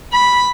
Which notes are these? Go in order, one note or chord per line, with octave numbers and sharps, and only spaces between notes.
B5